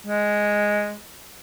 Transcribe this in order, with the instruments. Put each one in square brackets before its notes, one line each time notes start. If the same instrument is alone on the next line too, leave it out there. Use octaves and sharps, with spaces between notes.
[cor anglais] G#3